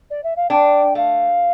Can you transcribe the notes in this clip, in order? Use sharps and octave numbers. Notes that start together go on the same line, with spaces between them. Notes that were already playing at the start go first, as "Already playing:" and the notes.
D5
E5
F5
D4 G5
A3 F5